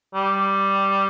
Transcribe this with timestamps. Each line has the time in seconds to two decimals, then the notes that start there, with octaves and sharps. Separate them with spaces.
0.15 G3